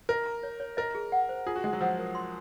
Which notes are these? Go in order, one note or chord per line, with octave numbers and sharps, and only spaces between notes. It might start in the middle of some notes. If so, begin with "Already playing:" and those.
A#4 D#5
A#5
C#5
C#5
A#4 D#5
G#4
F#5
C5
F4 G#4
F#4
G#3 F#5
F#3
F3 F#5
A#4
C6